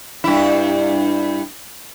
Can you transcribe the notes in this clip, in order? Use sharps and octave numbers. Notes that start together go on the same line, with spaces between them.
G2 E4